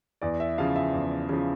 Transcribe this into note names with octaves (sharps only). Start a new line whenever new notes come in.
E2 D5
E5
C#3 F3 F5
E5
E2
C#3 F3